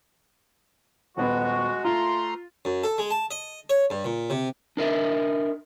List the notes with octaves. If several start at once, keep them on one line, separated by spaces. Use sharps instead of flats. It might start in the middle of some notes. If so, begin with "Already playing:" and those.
D#1 G#3 B3 F#4
A3 F4 A#5 C6
F#2
A4
G#3
A5
D#5
C#5
G2
A#2
C3
D4 A#4 D#5 E5